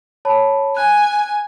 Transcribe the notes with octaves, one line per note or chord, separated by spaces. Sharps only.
C#5 A5 B5
G#5 F#6